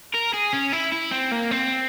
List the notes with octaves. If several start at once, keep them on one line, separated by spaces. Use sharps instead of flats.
A#4
G#4
C#4
E4
E4
C4
A#3
C4